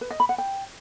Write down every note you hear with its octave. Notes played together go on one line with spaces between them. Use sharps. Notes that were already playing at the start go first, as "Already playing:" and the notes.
B4
D#5
B5
F#5
G5